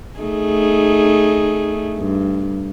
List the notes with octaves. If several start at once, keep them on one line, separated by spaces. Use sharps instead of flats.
A3 D#4 G#4
G2